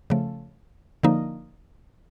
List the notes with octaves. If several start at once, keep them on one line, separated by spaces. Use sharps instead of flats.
C#3 F3 A3
D3 F3 A#3 D#4